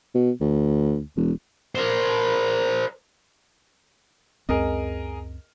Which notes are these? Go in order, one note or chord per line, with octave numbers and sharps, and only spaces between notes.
B2
D2
E1
A#4 C5
C#2 F#2 C4 G#4 A#4 D#5